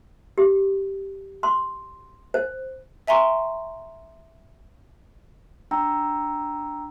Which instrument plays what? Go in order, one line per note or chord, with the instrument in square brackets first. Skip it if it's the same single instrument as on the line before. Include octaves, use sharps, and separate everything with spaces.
[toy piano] G4
C6
C5
[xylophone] E5 G#5 A#5 C6 C#6
[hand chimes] D4 G5 A#5 E6